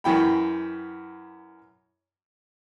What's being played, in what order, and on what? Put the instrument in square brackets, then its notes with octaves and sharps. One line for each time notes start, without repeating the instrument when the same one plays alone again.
[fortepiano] F#2 E3 G5 B5